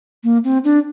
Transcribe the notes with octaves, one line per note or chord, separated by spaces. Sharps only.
A#3
C4
D4